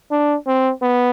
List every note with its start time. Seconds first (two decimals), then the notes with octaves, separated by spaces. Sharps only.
0.11 D4
0.47 C4
0.82 B3